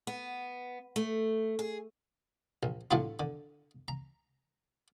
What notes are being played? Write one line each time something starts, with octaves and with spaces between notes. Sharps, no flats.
B3
A3
G#4
A#1
A2 D3 F#3 A3 E4 F4
D3
A#5